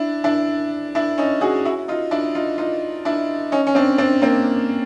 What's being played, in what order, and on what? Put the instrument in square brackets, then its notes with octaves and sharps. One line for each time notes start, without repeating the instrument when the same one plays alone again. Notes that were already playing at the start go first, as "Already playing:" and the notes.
Already playing: [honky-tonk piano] D4 E4
D4 E4
D4 E4
C#4 D#4
F#4 G#4
E4 F#4
D#4 F4
D4 E4
D#4 F4
D#4 F4
D4 E4
C#4 D#4
C#4
C4 D4
C4 D4
A#3 C4